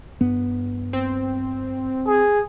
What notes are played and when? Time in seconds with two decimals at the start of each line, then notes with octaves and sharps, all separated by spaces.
0.21 G2 B3
0.93 C4
2.07 G#4